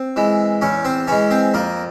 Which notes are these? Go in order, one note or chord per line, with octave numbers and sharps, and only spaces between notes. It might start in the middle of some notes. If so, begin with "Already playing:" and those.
Already playing: C4
E3 G#3
E2 C#4 C#5
C4 C5
E3 G#3 C#4 C#5
C4 C5
F2 A#3 A#4